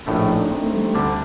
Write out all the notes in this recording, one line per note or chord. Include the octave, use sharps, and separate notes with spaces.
A#1 A2 A3 D4
D#4
D#4
D4
C4
A3
G3
C4
D2 D3 G3 D4